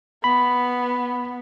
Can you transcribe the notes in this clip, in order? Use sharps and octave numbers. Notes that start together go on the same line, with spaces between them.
B3 B5